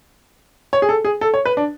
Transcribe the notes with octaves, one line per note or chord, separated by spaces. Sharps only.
C#5
G#4
A4
G#4
A4
C#5
B4
D4